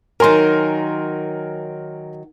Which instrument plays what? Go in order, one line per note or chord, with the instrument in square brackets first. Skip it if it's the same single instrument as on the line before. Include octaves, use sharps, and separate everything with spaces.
[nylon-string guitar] D#3 F#3 [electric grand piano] A#4 G#5 C6